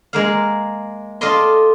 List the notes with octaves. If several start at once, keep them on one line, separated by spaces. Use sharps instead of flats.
G#3 A#3 F5
F4 A4 D5 D#5 C6